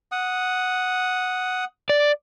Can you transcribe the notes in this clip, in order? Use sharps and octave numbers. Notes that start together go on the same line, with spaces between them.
F#5 D#6
D5